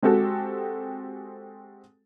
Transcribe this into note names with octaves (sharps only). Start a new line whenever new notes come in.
G#3 C4 F#4 G4 A4